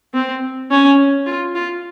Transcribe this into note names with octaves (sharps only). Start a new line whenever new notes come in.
C4
C#4
F4
F4